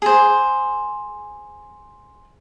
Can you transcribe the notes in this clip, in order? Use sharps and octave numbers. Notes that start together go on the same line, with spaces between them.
G#4 C5